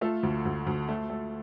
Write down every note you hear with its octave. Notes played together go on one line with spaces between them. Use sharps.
A3 F4 A4
D2
D2
D2
A3
A3